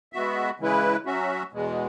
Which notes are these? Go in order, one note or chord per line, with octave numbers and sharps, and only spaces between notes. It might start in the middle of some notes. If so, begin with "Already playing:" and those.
G#3 B3 F#4 E5
C#3 E3 G#3 E4 B4
F#3 C#4 F#4 E5
E2 B2 G#3